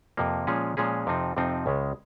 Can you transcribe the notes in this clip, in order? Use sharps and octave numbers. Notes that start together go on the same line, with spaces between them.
F2 C3 F3 A#3
A#2 F3 G#3 C#4 G#4
A#2 F3 G#3 C#4 G#4
F2 C3 F3 C4 D#4
F2 C3 F3 C4 D#4
C#2 C#3 G#3